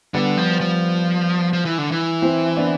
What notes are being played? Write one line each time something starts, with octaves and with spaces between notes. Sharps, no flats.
D3 G3 B3
F3
F3
F3
E3
D3
E3
C4 E4
B3 D4